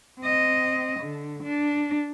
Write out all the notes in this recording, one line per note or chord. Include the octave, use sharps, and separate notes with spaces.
C4 D#5
D3
D4